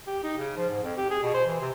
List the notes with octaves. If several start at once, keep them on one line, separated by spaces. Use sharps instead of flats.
G4
D#4
C#3
F3
G#2
F2
G4
G#4
B2
C5
E3
C3